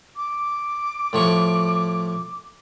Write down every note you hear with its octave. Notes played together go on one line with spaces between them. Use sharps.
D6
A2 F3 C#6